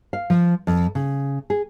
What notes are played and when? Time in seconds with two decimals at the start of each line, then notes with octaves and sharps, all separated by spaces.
0.13 F5
0.30 F3
0.67 F2
0.95 C#3
1.50 G#4